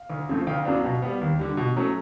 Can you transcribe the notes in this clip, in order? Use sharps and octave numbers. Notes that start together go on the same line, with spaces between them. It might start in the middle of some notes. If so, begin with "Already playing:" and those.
Already playing: F5
D2
C#3 F3 A3 C4
D2 F5 G5
C#3 F#3 B3 D4
B2
G3 B3
D#2
D3 G3
B2
F#3 A3 C#4